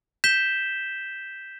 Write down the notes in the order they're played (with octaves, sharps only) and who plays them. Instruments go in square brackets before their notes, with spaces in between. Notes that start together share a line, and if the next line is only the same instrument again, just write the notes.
[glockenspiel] G6 B6 E7 G7